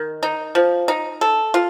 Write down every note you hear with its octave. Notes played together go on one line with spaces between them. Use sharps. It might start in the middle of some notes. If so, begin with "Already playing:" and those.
Already playing: D#3
D#4
F3
D#4
A4
F4